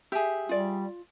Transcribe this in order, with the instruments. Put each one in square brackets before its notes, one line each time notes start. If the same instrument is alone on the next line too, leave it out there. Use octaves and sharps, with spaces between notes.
[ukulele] G4 [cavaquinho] G#4 E5
[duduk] G3 [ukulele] F4 D5